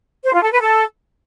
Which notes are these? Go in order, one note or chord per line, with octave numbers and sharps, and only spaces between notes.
C5
F4
A4
B4
A4